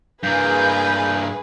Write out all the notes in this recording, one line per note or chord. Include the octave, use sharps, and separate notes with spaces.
G2 A#3 G#4 B4 G6